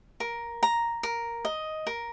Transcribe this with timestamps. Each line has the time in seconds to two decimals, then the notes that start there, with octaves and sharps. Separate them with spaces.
0.20 A#4
0.63 A#5
1.03 A#4
1.45 D#5
1.87 A#4